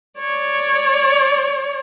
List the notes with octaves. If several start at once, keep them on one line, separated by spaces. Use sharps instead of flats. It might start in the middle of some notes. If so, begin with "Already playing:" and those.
C#5 D5